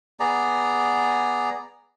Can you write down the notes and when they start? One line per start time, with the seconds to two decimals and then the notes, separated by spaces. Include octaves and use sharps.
0.20 B3 G#4 D5 A#5